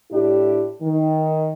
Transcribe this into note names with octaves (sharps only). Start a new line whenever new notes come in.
A2 D4 E4 G4
D#3